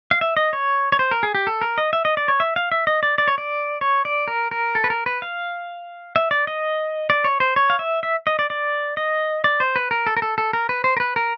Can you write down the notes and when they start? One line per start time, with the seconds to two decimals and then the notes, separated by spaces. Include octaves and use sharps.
0.11 F5
0.21 E5
0.37 D#5
0.53 C#5
0.92 C#5
0.99 C5
1.11 A#4
1.23 G#4
1.35 G4
1.47 A4
1.62 A#4
1.78 D#5
1.93 E5
2.05 D#5
2.17 D5
2.28 C#5
2.40 E5
2.56 F5
2.72 E5
2.87 D#5
3.03 D5
3.18 D5
3.28 C#5
3.38 D5
3.81 C#5
4.05 D5
4.28 A#4
4.51 A#4
4.75 A4
4.84 B4
4.90 A#4
5.06 B4
5.22 F5
6.16 E5
6.31 D5
6.47 D#5
7.10 D5
7.24 C#5
7.40 C5
7.56 C#5
7.70 F5
7.79 E5
8.03 E5
8.27 D#5
8.39 D5
8.50 D5
8.97 D#5
9.44 D5
9.60 C5
9.76 B4
9.91 A#4
10.07 A4
10.17 A#4
10.22 A4
10.38 A4
10.53 A#4
10.69 B4
10.84 C5
10.97 A#4
11.00 B4
11.16 A#4